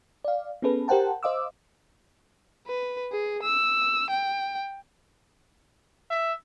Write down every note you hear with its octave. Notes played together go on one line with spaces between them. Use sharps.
D5 F5
B3 C#4 G#4 A4 B4
G4 A#4 C5 F#5 G5 A5
C5 D#5 F5 D6 E6
B4
G#4
E6
G5
E5